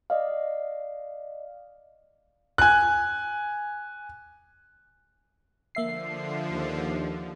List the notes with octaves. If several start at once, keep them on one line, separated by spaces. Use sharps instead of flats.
D5 D#5 F5
G#5 F#6
D3 F3 A#3 E5 C7
D#2